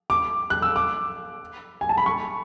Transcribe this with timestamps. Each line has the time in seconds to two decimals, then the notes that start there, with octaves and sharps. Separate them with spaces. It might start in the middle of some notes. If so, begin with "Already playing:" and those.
0.10 D6
0.50 F#6
0.62 E6
0.76 D6
1.81 G#5
1.89 A5
1.98 B5
2.06 C#6